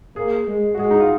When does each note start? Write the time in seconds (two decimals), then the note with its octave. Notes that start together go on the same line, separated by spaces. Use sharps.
0.16 A#3 G#4
0.47 G#3
0.75 F#4
0.78 G#3 G#4
0.91 D#4
1.00 F4